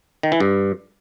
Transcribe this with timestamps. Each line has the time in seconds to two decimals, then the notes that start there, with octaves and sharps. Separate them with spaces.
0.23 D#3
0.32 E3
0.40 G2